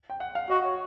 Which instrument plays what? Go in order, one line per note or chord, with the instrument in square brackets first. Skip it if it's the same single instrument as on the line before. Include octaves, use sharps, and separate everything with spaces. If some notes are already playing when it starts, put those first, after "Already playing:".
[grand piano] G5
F#5
F5
[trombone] F#4 [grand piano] D#5
[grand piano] C#5